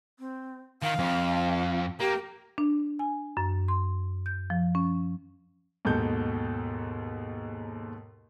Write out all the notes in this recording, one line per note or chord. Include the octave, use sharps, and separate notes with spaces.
C4
D#3 F5
F2
A#3 G4
D4
G#5
F#2
C6
G6
F3
C#4
D#2 G#2 B2 A4 G6